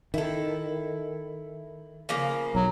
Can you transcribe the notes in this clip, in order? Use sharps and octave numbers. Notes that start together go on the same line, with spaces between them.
D#3 E4 A4
C#3 F3 A#3
B1 F#3